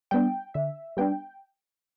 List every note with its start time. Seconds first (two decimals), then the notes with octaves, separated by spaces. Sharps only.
0.11 G3 B3 D4 G5
0.54 D3 E5
0.97 G3 B3 D4 G5